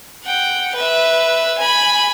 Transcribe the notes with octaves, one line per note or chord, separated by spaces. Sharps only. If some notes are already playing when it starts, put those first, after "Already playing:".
F#5 G5
B4 E5
G#5 B5